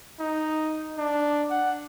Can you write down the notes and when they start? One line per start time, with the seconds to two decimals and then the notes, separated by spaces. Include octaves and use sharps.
0.20 D#4
0.98 D4
1.50 F#5